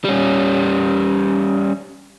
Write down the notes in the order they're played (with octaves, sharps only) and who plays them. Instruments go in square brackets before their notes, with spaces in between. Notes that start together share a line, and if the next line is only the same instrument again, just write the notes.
[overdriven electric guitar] G3 C#4